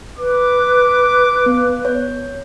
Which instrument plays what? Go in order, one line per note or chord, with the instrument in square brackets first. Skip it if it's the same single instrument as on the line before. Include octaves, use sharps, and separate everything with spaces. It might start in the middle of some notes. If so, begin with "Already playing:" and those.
[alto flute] B4 [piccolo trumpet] D6
[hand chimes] B3
C#5